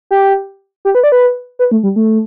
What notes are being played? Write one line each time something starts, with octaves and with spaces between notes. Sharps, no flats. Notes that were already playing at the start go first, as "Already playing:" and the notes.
G4
G4
B4
D5
B4
B4
A3
G3
A3